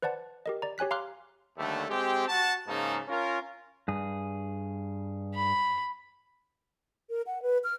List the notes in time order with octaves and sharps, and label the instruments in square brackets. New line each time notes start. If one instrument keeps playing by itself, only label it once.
[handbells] B4 C5 D5 F#5 A5
G4 A#4 D#5
D5 A#5
G4 C#5 G#5 F#6 B6
F5 A#5 C6 D6 F6 F#6
[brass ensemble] D#2 D3 G3 A3
G#3 C4 G4
F#4 A5
G#2 C#3 A#3 D#4 A5
C#4 F4 A#4
[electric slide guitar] G2 G#4
[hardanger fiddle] B5
[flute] A#4
F#5
B4
F6